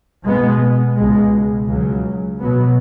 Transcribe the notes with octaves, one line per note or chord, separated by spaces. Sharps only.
B2 G#3 B3
C#2 B2 G#3
C#2 C#3 F#3
B2 F#3 B3